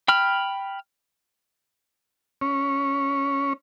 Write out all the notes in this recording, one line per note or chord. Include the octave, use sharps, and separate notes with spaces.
G5 B5 F6
C#4